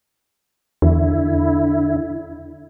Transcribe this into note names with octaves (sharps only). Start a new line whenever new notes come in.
E2 D3 E4